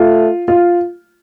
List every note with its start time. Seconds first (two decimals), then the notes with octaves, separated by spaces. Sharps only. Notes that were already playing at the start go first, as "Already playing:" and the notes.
Already playing: A3 F4
0.48 F4